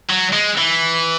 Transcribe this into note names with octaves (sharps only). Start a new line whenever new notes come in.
F#3
G#3
E3